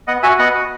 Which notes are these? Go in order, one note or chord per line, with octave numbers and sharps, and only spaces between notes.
B3 D#5 F#5
F#4 E5 G#5
B3 D#5 F#5
F#4